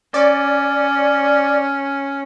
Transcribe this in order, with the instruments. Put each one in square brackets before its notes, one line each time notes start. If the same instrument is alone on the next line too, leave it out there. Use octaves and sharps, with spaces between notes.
[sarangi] C#4 [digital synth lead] D5